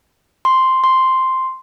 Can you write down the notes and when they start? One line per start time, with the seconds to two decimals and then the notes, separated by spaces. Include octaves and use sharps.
0.45 C6
0.84 C6